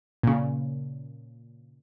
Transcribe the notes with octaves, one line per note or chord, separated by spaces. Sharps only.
A#2 C#3